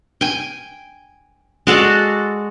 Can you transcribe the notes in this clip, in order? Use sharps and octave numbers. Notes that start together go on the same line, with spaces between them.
G5 G#5
G#3 F#4 A4 D5